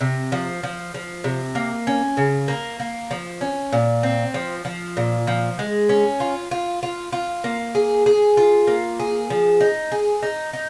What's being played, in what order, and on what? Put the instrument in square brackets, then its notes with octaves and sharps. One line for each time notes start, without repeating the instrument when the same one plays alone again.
[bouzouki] C3
F3
F3
F3
C3
A#3
C#4
C#3
A#3
A#3
F3
C#4
A#2
C4
F3
F3
A#2
F3
G#3
C#4
F4
F4
F4
F4
A#3
G#4
G#4
F4
A#3
G#4
F3
D#4
G#4
D#4
D#4